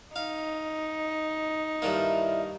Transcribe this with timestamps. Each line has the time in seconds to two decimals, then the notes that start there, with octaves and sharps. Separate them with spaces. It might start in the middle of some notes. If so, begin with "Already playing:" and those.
0.16 D#4 F5
1.82 G2 D#3 A#3 E4 B4 D5